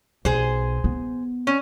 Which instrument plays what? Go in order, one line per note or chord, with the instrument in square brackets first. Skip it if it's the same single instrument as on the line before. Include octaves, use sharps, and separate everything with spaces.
[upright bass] B1 [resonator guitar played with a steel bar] G#4 C5
[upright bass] B3
[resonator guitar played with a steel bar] C#4